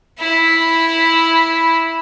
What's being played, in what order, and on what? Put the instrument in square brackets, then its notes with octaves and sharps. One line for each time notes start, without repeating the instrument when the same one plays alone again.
[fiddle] E4 B5